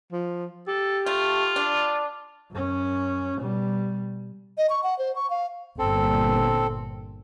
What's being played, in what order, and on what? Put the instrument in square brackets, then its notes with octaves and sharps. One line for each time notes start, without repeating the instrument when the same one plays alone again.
[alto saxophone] F3
[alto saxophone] G4 [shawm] A4
[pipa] A3 [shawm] F4
[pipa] D4
[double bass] F#2 C#4
B2 G3
[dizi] D#5
C#6
F#5
C5
C#6
F5
[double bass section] G1 A#2 [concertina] C4 A4